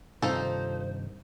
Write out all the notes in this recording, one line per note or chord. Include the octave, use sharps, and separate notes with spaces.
G2 C3 D#3 F3 D#4 A4 C5